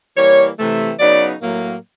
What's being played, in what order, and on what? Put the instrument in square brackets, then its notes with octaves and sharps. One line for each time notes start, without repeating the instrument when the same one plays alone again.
[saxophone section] E3 G3 A#3 C#5
C3 E3 A3
C#3 F#3 B3 D#4 D5
A2 F#3 A#3